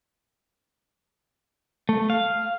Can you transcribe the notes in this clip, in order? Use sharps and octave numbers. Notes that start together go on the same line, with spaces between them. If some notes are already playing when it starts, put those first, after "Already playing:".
A3
F5